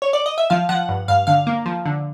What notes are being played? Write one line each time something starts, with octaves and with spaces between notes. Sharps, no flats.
C#5
D5
D#5
E5
F3 F5
F3 F#5
G2
G2 F5
D3 F5
A#3
F3
D3